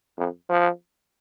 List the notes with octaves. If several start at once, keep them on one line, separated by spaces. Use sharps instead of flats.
F2
F3